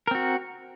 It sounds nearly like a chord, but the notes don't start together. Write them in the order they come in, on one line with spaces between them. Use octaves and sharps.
A#4 C4 F#4